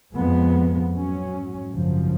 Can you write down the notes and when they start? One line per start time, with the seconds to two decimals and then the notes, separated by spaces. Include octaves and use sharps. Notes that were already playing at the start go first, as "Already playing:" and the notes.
0.15 F2 F3 G#3 B3
0.94 G#2 F#3 C#4
1.71 G#1 F#2 C#3 F3